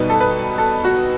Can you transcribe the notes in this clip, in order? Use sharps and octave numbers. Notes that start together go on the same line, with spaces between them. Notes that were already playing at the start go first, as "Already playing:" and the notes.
Already playing: B2 G3 D#4 B4
A4
B4
A4
F#4